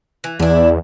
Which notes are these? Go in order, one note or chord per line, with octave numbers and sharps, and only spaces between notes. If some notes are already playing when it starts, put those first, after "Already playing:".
E3
E2 D4 E4